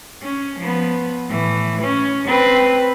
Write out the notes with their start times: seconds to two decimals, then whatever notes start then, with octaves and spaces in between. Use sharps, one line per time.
0.22 C#4
0.59 F3 B3
1.29 A2 E3
1.81 C#4
2.27 C4 B4